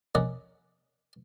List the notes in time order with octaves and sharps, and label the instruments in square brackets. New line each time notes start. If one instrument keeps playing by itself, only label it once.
[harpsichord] C#4 A#4 D5 D#5 F#5